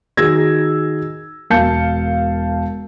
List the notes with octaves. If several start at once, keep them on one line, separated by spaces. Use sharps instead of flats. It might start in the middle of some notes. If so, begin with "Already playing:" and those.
D#3 F#4 G#4 E6 G#6 A#6
E1 A#4 F5 A5 G6 C#7